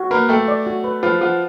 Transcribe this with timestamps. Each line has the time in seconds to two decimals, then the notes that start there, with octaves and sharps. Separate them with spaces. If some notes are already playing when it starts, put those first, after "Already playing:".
Already playing: F#4
0.11 A#3 A#4 B4
0.29 A3 A4 G5
0.48 D5
0.66 F#4
0.84 B4
1.03 F3 F4 B4
1.21 F3 F4 F#5